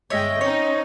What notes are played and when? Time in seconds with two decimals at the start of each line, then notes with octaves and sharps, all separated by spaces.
0.10 G1 G#3 C#5 D#5 E5 G5
0.41 C4 C#4 D#4 C#5